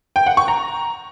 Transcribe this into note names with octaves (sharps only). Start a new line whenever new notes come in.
G5
F#5
C#6
A#5